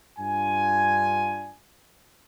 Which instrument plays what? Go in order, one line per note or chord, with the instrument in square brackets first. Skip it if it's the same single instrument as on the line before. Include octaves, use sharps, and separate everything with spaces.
[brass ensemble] G2 D4 F4 G#5